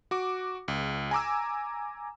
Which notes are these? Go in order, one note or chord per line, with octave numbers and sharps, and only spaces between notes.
F#4 D6
C#2
G#5 A#5 D6 E6